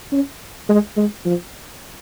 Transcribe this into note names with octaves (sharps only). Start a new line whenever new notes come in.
C#4
G#3
G#3
F3